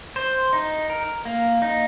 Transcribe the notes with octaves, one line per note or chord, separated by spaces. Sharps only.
C5
D#4
A#4
A#3
D#4